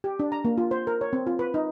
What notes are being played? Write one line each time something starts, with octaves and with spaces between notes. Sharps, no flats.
G4
D4
A#5
A#3
F4
C5
A#4
C#5
C4
F4
B4
D#4